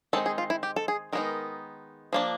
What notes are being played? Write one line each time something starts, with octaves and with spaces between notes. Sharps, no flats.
D#3 G#3 C4 D#4 A4
G#4
F4
E4
G4
A4
G#4
D#3 G#3 B3 D#4 A#4
F3 A#3 D4